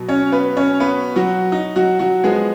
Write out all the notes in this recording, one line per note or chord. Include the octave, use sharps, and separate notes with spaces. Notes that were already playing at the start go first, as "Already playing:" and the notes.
Already playing: B2 F#3
C#4 C#5
B3 B4
C#4 C#5
B3 B4
F#3 F#4
D#4
F#3 F#4
F#3 F#4
F3 G#3 B3 G#4